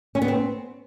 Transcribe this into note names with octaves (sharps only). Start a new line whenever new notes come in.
C#4
B3
C4